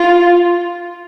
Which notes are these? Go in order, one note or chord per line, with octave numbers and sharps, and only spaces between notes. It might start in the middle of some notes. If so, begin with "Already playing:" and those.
Already playing: F4